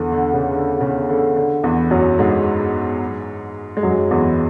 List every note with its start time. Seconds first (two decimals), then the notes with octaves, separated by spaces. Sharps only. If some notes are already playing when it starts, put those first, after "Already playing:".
Already playing: E2 D3 E3
0.12 D3
0.33 C#3
0.54 D3
0.81 C#3
1.09 D3
1.36 D3
1.64 E2 E3
1.91 F#2 F#3
2.19 G#2 G#3
3.77 G#3
3.83 F#2 F#3
4.11 E2 E3